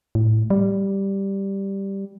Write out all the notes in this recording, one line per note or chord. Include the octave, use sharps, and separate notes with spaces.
A2
G3